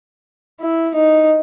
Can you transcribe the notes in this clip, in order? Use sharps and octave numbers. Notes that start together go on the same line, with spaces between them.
E4
D#4